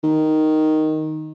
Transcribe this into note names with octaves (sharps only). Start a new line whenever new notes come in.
D#3